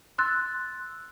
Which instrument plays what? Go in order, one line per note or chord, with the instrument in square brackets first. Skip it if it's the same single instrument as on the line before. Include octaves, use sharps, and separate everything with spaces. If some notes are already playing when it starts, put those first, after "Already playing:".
[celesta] C6 E6 F#6 A6